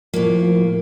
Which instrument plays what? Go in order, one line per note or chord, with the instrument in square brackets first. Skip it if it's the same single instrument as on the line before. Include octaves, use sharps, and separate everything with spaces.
[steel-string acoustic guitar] A2 A#3 [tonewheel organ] F3